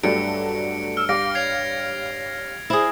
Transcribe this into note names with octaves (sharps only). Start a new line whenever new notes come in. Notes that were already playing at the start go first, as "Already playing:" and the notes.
G2 F#3 A3 D4 C#7 D7
E6 F6
G3 G4 F5 D6 A#6 D7
C#5 G#6 C7 F7
E4 G#4 C5